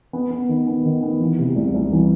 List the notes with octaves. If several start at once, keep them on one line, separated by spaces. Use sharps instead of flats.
B3
B3
D#3
B3
D#3
B3
E3
C3
C2
C2
E3